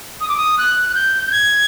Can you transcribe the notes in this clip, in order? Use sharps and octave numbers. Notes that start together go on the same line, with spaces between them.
D#6
D6
D#6
F#6
F#6
G6
G6
G#6